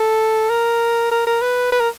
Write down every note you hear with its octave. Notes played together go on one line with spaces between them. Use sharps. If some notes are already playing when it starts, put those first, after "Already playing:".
Already playing: A4
A#4
A#4
A#4
B4
B4
A#4